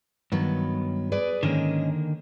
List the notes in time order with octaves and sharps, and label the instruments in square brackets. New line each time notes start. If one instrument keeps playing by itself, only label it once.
[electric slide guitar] G2 [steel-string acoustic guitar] D#3 F#3 B3
[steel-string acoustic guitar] G#4 B4 D5
[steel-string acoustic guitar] G#2 C#4 D#5 [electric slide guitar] D3 D#3 A#3